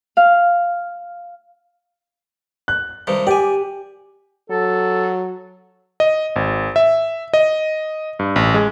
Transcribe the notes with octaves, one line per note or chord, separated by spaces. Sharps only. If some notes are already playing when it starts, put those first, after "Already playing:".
F5
F#6
G2 C3 D#3
G4 D5 G#5
F#3 A4
D#5
G#1
E5
D#5
G2
A1
G#3